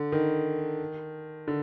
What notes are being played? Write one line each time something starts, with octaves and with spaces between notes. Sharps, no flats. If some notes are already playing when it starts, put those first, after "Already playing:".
Already playing: D3
D#3
D3